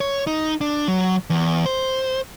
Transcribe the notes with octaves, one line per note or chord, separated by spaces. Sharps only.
C#5
D#4
D4
F#3
E2
C5